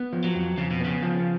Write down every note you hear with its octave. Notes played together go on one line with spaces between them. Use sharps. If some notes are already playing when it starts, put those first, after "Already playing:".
Already playing: B3
F3
F#3
F2
F2 C#3
B2
C#3 B3
F3